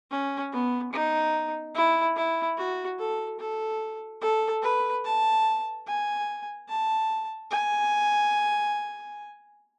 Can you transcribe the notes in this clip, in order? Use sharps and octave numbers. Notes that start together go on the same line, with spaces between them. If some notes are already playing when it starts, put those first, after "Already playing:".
C#4
B3
D#4
E4
E4
F#4
A4
A4
A4
B4
A5
G#5
A5
G#5